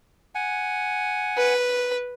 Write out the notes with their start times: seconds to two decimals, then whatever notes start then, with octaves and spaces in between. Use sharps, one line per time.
0.35 F#5 G#5
1.38 B4